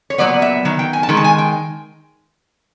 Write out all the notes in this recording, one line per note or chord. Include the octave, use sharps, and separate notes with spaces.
C#5
A#2 F#3 B3 D5
E5
D#3 F#3
G5
G#5
A5
D#3 G#3
A5
G#5
G5